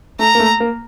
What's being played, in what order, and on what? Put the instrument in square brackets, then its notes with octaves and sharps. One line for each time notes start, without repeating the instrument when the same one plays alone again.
[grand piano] A3 [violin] A#5
[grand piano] A#3
A3
A#3